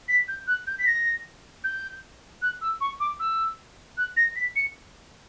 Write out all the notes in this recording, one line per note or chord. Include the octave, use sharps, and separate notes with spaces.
B6
G6
F#6
G6
B6
A#6
G6
F#6
E6
C#6
D6
E6
F#6
A#6
B6
C#7